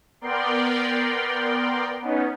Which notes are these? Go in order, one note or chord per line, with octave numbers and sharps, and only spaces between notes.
B3 A#4 D5 G5 C6
B3 C#4 D#4